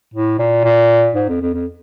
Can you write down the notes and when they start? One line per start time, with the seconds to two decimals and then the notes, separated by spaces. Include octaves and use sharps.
0.14 A2
0.39 A#2
0.64 A#2
1.15 G#2
1.29 F2
1.42 F2
1.54 F2